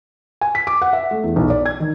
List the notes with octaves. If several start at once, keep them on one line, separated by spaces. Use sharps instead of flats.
G#5
B6
D6
F#5
E5
A3
E2
B1
D5
G#6
D#3